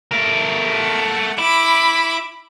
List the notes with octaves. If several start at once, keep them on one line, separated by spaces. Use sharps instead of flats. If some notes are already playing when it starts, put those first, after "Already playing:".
A3 A#4
F#5
E4 B5 D6